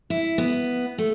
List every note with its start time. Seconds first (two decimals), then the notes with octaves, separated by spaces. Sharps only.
0.10 E4
0.38 B3
0.98 A3